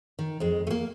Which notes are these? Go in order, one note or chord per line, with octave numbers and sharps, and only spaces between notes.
D#3
F2 G#3
A3 A#3